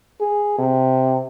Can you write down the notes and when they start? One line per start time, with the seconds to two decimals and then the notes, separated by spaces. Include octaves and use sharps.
0.20 G#4
0.58 C3